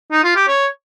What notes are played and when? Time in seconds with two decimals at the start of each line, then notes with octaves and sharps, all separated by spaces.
0.12 D#4
0.24 F4
0.36 G4
0.48 C#5